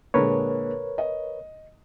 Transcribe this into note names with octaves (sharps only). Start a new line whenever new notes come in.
A#2 D3 G#3 A#4 B4 C#5
D#5